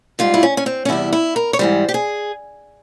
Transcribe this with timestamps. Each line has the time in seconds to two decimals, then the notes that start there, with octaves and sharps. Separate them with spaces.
0.19 G#2 G3 F4
0.34 E4
0.43 C#4
0.57 C#4
0.66 C4
0.85 C#4
0.89 E2 C3 G3 E4
1.13 E4
1.36 A#4
1.53 C#5
1.59 G#2 E3 G3 C5
1.89 G4
1.94 G#4